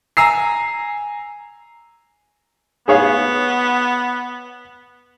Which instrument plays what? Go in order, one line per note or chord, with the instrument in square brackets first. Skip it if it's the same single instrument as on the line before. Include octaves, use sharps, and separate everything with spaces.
[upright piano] G#5 A#5 E6 C7
[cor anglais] B3 [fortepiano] G#4 C#5 F5